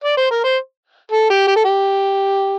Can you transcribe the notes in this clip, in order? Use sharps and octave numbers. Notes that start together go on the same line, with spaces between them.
D5
C5
A#4
C5
A4
G4
G4
A4
G4